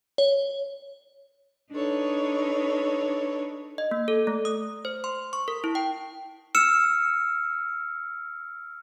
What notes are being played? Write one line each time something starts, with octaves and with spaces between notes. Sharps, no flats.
C#5
D4 D#4 A4 B4 C#5
D#5
A#3
A4
A3
D#6
C5
C6
C#6
A#4
E4
G5
E6 F6 C#7 E7